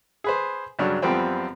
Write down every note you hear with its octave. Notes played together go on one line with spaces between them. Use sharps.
G#4 B4 C5
G2 C#3 F#3 D4
F#2 F3 G3 B3 C4 G5